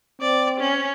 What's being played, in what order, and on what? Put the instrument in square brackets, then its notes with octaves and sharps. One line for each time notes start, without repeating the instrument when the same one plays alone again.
[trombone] C4 [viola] D5
[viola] C#4